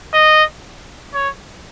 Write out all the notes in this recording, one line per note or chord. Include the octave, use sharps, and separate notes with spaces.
D#5
C#5